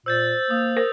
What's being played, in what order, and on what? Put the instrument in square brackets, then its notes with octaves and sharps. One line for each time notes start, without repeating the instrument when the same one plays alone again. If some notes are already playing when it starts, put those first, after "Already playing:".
[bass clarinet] A#2 [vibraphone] C5 [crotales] E6 G6 A6
[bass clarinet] A#3 [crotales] D#6
[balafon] A#4 C5